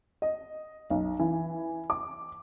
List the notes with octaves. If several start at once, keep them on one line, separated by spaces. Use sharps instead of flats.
D#5
B1
E3
D6